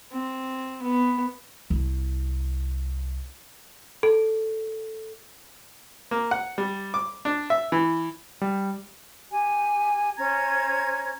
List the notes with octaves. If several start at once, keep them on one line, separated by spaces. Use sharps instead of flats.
C4
B3
C2 E4
A4
A#3
F#5
G3
D6
D4
E5
E3
G3
G4 G#5
C#4 C5 A#5 G#6